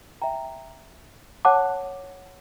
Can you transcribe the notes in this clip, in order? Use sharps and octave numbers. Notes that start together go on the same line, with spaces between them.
E5 G5 A#5
C#5 F#5 A5 D6 F#6